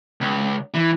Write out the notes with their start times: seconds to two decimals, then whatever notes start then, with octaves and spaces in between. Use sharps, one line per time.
0.21 C#2
0.74 E3